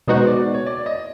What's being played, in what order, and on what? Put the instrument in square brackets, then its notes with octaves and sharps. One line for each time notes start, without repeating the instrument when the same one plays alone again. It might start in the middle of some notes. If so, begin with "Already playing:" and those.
[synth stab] B2 G#3 B3 D#4 F#4 [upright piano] C5
[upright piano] D5
C#5
D5
D#5